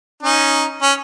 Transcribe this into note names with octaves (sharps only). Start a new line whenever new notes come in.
C#4 D#4
C#4